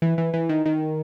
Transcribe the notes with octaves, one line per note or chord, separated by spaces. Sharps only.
E3
E3
E3
D#3
D#3